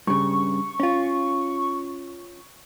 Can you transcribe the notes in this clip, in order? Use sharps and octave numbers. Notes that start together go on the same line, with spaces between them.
G2 C#3 C#6
C#4 F4